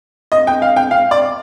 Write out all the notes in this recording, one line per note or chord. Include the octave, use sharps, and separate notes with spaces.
D#5
G5
F5
G5
F5
D5